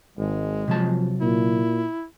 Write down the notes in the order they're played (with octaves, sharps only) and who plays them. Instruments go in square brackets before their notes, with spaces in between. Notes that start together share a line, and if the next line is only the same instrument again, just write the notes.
[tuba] G#1 [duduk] G#3
[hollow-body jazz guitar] C3 F#3 A5 [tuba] F3
[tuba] A#2 [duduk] E4